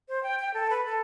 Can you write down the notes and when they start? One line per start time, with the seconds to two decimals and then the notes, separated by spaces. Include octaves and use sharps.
0.09 C5
0.23 G5
0.39 G5
0.54 A4
0.70 B4
0.85 A4